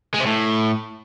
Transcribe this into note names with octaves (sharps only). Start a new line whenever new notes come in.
G#3
C3
A2